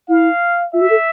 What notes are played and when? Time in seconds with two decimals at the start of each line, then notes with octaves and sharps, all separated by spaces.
0.09 E4 F5
0.73 F4 E5
0.81 F#4
0.90 A4